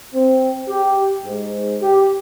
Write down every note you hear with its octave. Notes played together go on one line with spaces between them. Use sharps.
C4
G4
G#2
G4